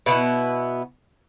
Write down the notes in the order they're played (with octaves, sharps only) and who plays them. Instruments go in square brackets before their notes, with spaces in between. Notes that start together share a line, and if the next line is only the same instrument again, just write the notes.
[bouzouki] B2 B3 E4